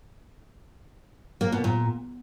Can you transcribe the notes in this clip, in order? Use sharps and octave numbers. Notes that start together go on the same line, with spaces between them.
A#3
B2
A#2